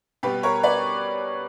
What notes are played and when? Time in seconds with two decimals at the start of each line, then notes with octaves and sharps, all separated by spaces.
0.23 B2 G3 B3 G4 B4
0.43 A#4 C#5
0.63 B4 D5